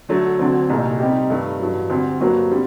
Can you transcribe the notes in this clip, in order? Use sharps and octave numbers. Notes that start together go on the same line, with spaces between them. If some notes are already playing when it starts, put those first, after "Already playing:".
D3 F#3 A3
D2 D3 F#3 C4
C2 A#2 A3 D#4
C3 G3 C4 D#4 G4
G2 D#3 A3
A1 G2 F#3
D2 D3 G3 C4
G2 F#3 A#3 F#4 C5
D3 G3 C4